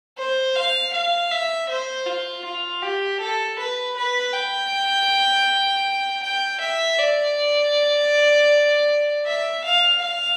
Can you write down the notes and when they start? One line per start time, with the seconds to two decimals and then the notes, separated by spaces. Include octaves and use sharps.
0.18 C5
0.55 F5
0.93 F5
1.31 E5
1.69 C5
2.06 F4
2.44 F4
2.82 G4
3.20 A4
3.58 B4
3.96 B4
4.33 G5
6.23 G5
6.60 E5
6.99 D5
9.26 E5
9.64 F5
10.01 F5